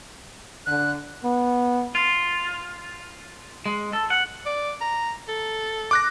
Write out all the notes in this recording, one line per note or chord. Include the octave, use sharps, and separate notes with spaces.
D3 F#6
B3
F4
G#3
A4
F#5
D5
A#5
A4
D6 F#6 A#6